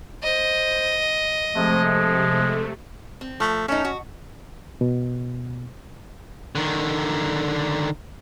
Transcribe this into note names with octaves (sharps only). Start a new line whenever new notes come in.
C5 D#5
C3 F3 G#3 A3
C4
F3 A3
A3 C#4 D#4
F#4
B2
D3 D#3